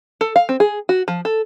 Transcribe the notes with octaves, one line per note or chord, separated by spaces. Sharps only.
A4
F5
C4
G#4
F#4
F3
A4